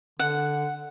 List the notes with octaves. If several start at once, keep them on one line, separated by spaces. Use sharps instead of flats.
D3 F#5